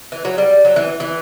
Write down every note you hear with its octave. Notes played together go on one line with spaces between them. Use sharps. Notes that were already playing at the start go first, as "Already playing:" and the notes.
E3
F#3
G3
F#3
E3
E3